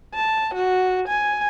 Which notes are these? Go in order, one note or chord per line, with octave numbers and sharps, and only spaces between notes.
A5
F#4
G#5